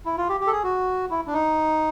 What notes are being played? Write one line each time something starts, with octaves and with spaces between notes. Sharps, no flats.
E4
F4
G4
G4
A4
G#4
F#4
E4
D4
D#4